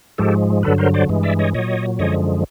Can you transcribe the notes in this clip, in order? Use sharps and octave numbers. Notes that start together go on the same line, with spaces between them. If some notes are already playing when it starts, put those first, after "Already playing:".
G#2 F3 G#3 G4 A4
G2 D3 F#3 A4 B4
A#4 C5
C5 D5
G2 E3 G#3
D5 E5
C#5 D#5
A#2 F#3 C#5 D#5
F#2 D3 F3 G#3 C#5 D#5